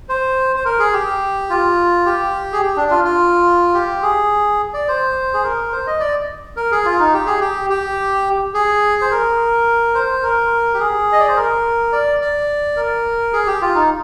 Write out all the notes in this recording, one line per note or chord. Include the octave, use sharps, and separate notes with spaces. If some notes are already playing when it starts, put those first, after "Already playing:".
C5
C5
A#4
G#4
G4
F4
G4
G#4
G4
D4
F4
F4
G4
G#4
D5
C5
G#4
A#4
C5
D#5
D5
A#4
G#4
F4
D#4
G4
G#4
G4
G4
G#4
C5
A#4
C5
A#4
G4
G#4
D#5
D5
C5
A#4
D5
D5
A#4
G#4
G4
F4
D#4